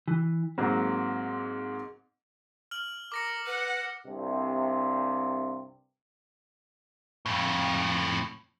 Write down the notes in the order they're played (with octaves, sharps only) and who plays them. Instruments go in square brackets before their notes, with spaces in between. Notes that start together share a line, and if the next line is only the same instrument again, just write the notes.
[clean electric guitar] E3
[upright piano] G#2 F#3 A#3 [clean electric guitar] C4
[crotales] F6 F#7
[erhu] A#4 [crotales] D6 A#6 C#7
[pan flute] B4 [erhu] F#5
[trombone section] C2 G2 C3
[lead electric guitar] F2 A2